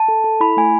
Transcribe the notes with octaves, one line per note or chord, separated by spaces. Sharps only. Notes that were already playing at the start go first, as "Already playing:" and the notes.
Already playing: A5
A4
A4
E4 B5
A3 G#5